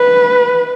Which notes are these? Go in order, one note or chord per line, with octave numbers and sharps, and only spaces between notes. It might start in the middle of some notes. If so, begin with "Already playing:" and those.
Already playing: B4